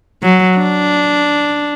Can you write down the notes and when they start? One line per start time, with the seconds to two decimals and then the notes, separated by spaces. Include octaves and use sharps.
0.23 F#3
0.58 D4